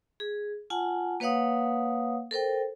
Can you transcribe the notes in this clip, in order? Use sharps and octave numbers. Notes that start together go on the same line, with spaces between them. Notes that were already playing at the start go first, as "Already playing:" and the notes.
G#4
F4 F#5 G#5 A5
A#3 B4 C#5 F5 F#5 D#6
A4 A#4 C5 G5